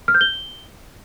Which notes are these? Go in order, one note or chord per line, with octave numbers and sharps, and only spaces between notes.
F6
G6
G7